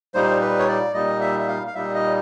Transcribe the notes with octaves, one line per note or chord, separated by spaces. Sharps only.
A#2 G3 A#3 D#4 C5
B4
C#5
D5
A#2 G3 A#3 D#4 D#5
E5
E5
F5
F5
A#2 G3 A#3 D#4 E5
D#5